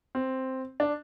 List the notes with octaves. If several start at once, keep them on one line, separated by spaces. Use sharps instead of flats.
C4
D4